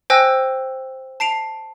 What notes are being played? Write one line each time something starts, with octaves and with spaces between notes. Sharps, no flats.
C5 G5 G#5 E6 F#6 A#6
A5 C7 D7 F7